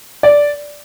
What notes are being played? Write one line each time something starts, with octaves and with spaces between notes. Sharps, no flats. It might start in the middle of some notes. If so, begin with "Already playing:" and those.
D5